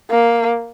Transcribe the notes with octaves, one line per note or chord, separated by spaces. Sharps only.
A#3